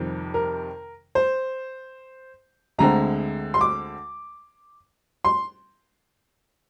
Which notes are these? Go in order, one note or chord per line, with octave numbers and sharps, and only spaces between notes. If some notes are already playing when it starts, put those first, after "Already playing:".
Already playing: F2 C3 D#3 G3
A#4
C5
D2 D3 G#3 C4 A#5
C6
D6
C6